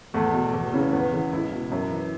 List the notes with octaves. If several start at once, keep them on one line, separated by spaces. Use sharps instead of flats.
E2 A3
B2
E2
C#3 E3
E2 B3
C#3 E3
C#2 E4
B2
F#2
E3